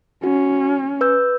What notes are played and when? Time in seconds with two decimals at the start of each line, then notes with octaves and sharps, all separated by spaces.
0.24 C#4 F#4
1.01 B4 E6 G6